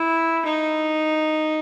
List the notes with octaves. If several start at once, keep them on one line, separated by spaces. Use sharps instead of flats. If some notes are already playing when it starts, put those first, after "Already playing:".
Already playing: E4
D#4